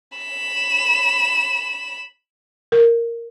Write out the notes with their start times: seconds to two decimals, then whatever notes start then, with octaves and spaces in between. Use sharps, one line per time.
0.18 B5 E7
2.72 A#4